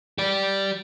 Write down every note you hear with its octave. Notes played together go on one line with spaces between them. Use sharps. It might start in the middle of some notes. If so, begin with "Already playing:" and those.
G4 D5